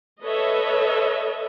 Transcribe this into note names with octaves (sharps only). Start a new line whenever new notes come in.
A4 B4 C#5 D#5 E5